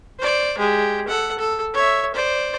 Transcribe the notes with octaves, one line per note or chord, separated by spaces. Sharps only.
C5 D5
G#3 G4
A4 F#5
A4
C#5 E5
C5 D5